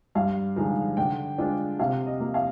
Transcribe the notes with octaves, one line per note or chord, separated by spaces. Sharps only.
G2 F5
D3 F3 G#3 D#4
D3 G5
G#3 D4 F4
C3 F5
D#5
F3 A#3
F5